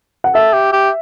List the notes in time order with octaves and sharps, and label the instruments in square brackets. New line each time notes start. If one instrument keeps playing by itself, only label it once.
[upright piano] F#5
[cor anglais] A4 [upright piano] E5
[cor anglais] G4
G4